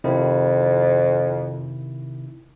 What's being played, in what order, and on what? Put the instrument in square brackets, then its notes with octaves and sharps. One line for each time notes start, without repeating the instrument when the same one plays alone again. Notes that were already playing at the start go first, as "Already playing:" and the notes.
[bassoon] F2 [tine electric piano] C3 D#3 E4